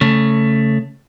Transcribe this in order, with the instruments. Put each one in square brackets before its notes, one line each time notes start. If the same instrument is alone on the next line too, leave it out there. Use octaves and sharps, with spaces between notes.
[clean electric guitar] C#3 A3